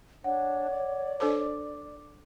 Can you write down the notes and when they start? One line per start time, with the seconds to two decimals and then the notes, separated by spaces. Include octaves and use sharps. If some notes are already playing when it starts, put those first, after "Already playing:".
0.24 D4 C#5 F#5
0.70 D5
1.20 D4 A4 C5 D6